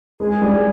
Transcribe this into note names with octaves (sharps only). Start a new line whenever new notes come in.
G#3 G#4
G3